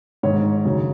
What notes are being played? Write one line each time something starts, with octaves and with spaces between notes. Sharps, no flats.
G#2 D#3 C#5
F#2 C#3